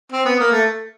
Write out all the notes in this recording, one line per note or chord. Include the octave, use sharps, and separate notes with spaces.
C4
B3
A#3
A3